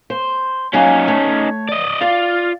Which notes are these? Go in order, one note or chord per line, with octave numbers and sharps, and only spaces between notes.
C5
F#3 A#3 C#4 D#4 G#5
A3 C#5
D5 D#5
F4 D5 F5